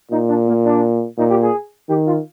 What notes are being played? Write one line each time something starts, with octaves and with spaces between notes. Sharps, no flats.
A#2 D#4
D4
A#3
D4
A#2 D#4
G4
G#4
D#3 G4
F4